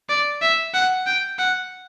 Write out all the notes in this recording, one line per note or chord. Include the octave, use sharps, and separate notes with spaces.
D5
E5
F#5
G5
F#5